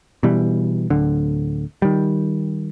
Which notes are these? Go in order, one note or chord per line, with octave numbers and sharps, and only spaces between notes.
B2 E3 G3
D1 D3
D#3 G3